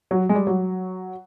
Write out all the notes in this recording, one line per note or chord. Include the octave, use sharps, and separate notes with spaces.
F#3
G#3
G3
F#3